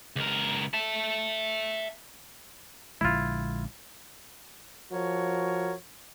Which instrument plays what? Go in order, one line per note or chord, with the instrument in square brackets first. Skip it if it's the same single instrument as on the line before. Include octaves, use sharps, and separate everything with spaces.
[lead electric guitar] C#2 A#4
E5 A5
[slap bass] A#1 D3 G#3 [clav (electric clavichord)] E4 F4
[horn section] F3 F#4 A#4 C#5